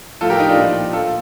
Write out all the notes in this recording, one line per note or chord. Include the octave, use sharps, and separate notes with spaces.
A2 F3 F4 A4
G4 A#4
D#4
D4 F4
A#2 F3
A#2 F3 F4 A4